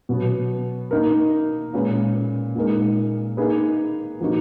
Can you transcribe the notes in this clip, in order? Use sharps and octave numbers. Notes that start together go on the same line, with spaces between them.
B2 F#3 B3
A#3 D#4 A#4
A#2 G#3 C#4 G#4 B4
A#2 G#3 D#4 A#4
A#3 D#4 G#4 B4
A#2 F3 A#3 D#4 F#4